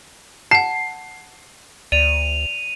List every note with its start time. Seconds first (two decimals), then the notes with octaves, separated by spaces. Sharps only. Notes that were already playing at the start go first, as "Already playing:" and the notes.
0.51 F#5 A5 C7
1.92 D2 D5 D#7 F7